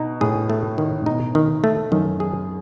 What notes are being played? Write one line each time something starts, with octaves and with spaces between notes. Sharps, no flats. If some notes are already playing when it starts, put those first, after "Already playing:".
Already playing: B2 D#4
A2 G#4
A3
D#3
A2
B2 D#4
D#3
A3
F#2 D#3
G#4